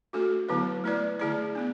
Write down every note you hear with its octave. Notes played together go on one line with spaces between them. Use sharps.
A3 D4 F#4 A4
D3 F#3 B3 E4 B4
A3 E4 B4 D5
D3 A3 E4 G#4 D5
B3 D4